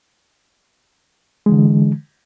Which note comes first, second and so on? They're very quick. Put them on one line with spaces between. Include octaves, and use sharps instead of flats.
G#3 E3 D3